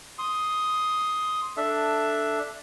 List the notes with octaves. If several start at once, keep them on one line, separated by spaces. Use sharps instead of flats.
C6 D#6
D4 A4 E5